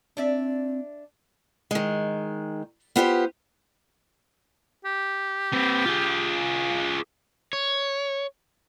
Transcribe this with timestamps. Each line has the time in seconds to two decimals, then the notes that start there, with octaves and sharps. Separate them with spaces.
0.17 C4 D4 D5 E5
1.71 D#3 G#3
2.96 B3 F4 G4 C5
4.85 G4
5.53 C4 B4
5.85 F4 G#4
7.53 C#5